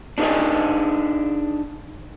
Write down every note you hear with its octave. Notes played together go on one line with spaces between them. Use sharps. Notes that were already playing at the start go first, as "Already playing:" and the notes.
D4 D#4 G#4 A4 D5 D#5